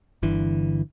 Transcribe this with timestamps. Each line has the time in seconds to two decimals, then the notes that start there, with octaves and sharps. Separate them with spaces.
0.23 G1 D3 E3